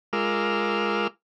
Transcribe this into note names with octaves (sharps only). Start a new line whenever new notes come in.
G#3 F4 A#4 D6 E6 F6